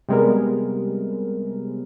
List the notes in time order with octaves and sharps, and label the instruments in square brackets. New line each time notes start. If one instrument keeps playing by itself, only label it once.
[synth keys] C3 G3 G#3 B3 A#4